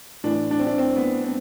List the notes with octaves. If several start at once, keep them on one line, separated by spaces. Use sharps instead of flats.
A2 E3 D4
D4
C4
D4
C4
B3
C4